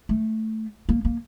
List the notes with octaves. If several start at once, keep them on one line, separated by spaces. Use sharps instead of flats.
A3
A#3
A#3